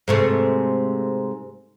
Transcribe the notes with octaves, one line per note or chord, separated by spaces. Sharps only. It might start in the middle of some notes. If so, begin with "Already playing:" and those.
G#2 C3 A3